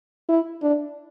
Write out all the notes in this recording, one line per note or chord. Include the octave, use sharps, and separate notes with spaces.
E4
D4